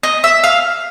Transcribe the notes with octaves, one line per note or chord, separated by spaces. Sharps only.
D#5
E5
F5